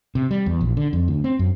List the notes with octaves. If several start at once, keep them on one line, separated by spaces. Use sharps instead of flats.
C3
G3
E2
A#1
D3
F2
D2
C4
F#2